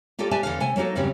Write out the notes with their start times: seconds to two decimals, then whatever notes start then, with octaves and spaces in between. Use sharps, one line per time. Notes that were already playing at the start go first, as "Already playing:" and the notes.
0.19 A#3 F4 G4 A4 D5
0.31 G4 B4 D5 E5 G#5 A5
0.43 E2 D3 B4 F5
0.60 C3 A3 G#5
0.76 F#3 A#3 D#4 F#4 A4
0.95 E2 G2 C#3 F#3 G3 C4